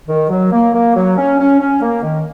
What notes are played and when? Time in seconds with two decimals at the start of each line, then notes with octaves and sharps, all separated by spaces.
0.08 D#3
0.30 F#3
0.52 A#3
0.74 A#3
0.96 F#3
1.17 C#4
1.38 C#4
1.60 C#4
1.81 A#3
2.03 D#3